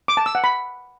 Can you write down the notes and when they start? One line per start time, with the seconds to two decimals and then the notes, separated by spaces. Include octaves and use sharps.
0.08 D6
0.17 A5
0.26 E6
0.35 F#5
0.44 B5